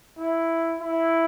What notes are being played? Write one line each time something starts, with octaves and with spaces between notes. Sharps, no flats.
E4
E4